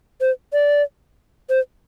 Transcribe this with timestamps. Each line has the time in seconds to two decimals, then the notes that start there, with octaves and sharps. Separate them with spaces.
0.21 C5
0.53 D5
1.49 C5